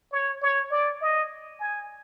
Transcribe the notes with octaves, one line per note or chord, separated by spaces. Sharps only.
C#5
C#5
D5
D#5
G#5